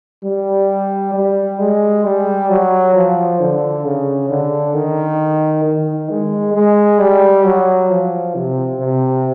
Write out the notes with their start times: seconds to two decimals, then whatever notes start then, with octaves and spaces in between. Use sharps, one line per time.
0.24 G3
1.15 G3
1.59 G#3
2.04 G3
2.49 F#3
2.95 F3
3.40 D3
3.85 C#3
4.30 D3
4.74 D#3
5.65 D#3
6.10 G#3
6.54 G#3
6.99 G3
7.44 F#3
7.90 F3
8.35 C3
8.79 C3